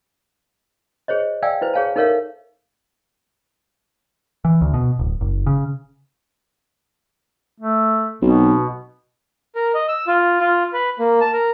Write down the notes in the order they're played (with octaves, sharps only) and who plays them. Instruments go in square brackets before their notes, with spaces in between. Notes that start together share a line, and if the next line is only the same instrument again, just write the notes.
[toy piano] G#4 C5 C#5 D#5
D5 E5 F5 G5 G#5 E6
E4 B4 C5
G#4 C#5 F5 G#5 A5
D#4 A4 A#4 C#5 E5 F5
[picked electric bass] E3
D2
B2
D1
F#1
C#3
[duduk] A3
[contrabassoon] B1 [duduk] B2 [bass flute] C4
[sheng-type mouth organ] A#4
D#5
E6
F4
F4
B4
A#3
A5
A#4